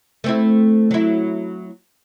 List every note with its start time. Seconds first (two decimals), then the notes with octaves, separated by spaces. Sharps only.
0.24 A3 C4 E4
0.91 F#3 E4